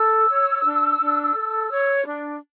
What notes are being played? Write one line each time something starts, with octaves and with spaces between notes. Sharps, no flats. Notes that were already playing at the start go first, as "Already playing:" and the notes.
Already playing: A4 E6
C#5
D4
D4
A4
C#5
D4